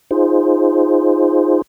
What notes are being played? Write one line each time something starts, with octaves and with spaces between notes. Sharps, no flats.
D#4 F4 G#4 C5